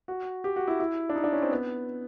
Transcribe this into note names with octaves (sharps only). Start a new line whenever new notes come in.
F#4
G4
F#4
E4
E4
D4
D#4
D4
C#4
C4
B3